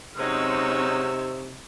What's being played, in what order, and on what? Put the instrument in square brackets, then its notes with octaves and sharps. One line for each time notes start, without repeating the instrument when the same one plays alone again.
[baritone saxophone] C3 [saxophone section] F#3 G#3 C#4 [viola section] C4 D#4 C#5 [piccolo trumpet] E6